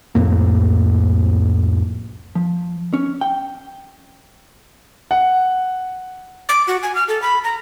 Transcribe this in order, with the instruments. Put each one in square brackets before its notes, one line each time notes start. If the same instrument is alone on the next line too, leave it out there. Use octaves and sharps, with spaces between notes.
[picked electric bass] C2 F2 A2 A#3
[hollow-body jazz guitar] F3
C#4
G5
[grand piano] F#5
[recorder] D6
F#4
G#5
F6
A4
B5
A#5